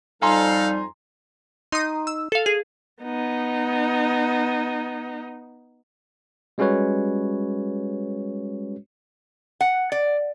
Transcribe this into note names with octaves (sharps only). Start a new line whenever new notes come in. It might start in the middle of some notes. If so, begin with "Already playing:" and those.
F2 G3 D#4 A4 F5 G#5 A#5 C6
D#4 C6 D#6
E6
A4 F5
G#4
B3 D#4
G3 G#3 C#4 F#4 B4 C#5
F#5
D5